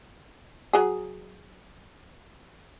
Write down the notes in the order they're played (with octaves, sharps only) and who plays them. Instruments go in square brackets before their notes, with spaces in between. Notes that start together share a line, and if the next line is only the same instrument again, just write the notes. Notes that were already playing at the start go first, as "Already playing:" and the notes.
[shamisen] F#3 G#4